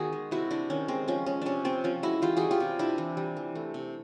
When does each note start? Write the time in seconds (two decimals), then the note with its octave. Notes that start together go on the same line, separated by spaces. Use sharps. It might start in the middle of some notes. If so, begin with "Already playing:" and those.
Already playing: D#3 B3 F#4 G#4
0.13 G#3
0.31 C3 E4 F#4
0.50 C3 D4 E4
0.70 D#3 C#4
0.88 G#3 C4
1.08 F3 C#4
1.26 G#3 C#4
1.42 C3 C#4 D4
1.65 C3 C4
1.84 F3 C#4
2.03 G#3 E4 F#4
2.22 E3 F4 G4
2.37 G3 F#4 G#4
2.51 F4 G4
2.60 C3
2.79 C3 D4 E4
2.98 E3
3.17 G3
3.37 E3
3.55 A3
3.74 C3